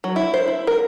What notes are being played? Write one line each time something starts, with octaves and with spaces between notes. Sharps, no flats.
F#3
E4
C5
E4
A#4